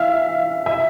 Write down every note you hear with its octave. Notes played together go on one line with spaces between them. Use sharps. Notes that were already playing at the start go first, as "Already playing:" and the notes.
Already playing: E5 F5
E5